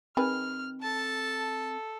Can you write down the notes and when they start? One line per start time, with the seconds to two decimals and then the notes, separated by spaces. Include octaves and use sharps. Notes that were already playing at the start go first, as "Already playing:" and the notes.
0.17 D#3 C4 G#4 B4 F6
0.83 A4 A5